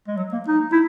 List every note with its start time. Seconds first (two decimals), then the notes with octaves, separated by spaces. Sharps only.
0.08 G#3
0.17 F#3
0.33 A#3
0.48 D#4
0.72 E4